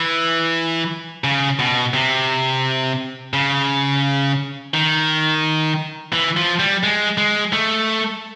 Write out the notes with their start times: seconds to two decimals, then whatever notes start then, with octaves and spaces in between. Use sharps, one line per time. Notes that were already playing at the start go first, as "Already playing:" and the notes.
Already playing: E3
1.24 C#3
1.59 B2
1.94 C3
3.34 C#3
4.74 D#3
6.13 E3
6.37 F3
6.59 G3
6.83 G#3
7.18 G#3
7.53 A3